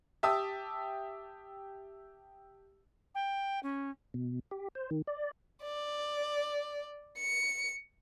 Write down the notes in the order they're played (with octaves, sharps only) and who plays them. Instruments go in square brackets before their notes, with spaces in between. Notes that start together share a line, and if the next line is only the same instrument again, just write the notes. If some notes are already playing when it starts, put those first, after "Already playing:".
[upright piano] G4 E5 A5 D#6 E6
[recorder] G5
C#4
[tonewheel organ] B2
G4
C5
D#3
D5
[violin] D5
C#7